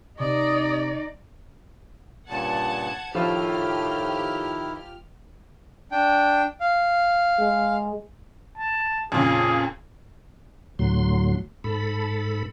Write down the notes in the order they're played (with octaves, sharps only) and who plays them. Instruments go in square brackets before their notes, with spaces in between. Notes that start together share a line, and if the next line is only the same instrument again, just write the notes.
[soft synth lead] C3 [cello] D#4 [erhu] D5 [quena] D#6
[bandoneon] G2 A#2 C#3 [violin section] F#5 A5 G#6
[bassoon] A2 [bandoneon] D#3 E4 [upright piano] F3 F4 [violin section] G4 F6
[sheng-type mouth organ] D4 G5
F5
[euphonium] G#3
[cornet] A5
[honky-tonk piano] F2 A#2 C#3 [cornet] G#4
[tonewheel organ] D2 A2 F#3 C6
G#2 A4 B5